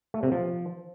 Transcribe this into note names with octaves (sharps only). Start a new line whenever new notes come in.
A3
C3
F3